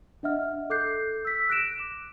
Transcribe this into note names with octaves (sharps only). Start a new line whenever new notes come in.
D4 D#5 E5 F#5 F6
A4 D6 F#6 G6 C7
E6 B6
F#6 A#6 D7 E7
D6